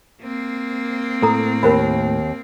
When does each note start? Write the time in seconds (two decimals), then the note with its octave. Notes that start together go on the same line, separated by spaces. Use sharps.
0.22 A#3 C4
1.22 A2 A4 A#5 D#6
1.63 D#2 A#4 C5 B5